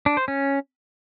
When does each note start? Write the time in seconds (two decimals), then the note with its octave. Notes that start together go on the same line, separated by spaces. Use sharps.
0.06 D4
0.17 C5
0.28 C#4